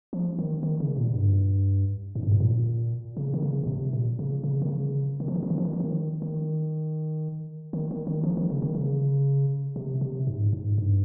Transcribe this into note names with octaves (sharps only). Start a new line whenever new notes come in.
F3
D#3
D#3
C#3
A#2
G2
G#2
G2
G#2
A#2
C#3
D#3
C#3
A#2
C3
A#2
C#3
C#3
D#3
C#3
D#3
F3
D#3
F3
D#3
F3
D#3
F3
D#3
D#3
D#3
D#3
D#3
F3
D#3
C#3
D#3
C#3
C3
C3
G#2
G#2
G2